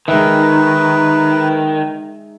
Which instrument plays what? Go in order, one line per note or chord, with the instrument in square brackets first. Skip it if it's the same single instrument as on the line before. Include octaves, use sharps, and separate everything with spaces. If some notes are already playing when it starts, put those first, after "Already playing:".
[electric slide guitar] D#3 [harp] G#3 D#4 E5 [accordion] B4